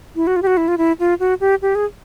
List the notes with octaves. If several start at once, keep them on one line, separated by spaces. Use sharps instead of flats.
E4
F#4
F4
G4
F#4
E4
F4
E4
F4
F#4
G4
G4
G#4